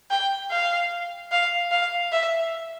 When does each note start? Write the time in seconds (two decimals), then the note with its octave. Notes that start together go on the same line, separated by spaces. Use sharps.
0.10 G5
0.51 F5
1.32 F5
1.71 F5
2.12 E5